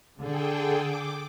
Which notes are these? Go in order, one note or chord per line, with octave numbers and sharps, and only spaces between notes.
D3 G#4 A4 G5
D6